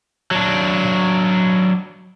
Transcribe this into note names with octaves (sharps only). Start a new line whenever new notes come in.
F#3 D4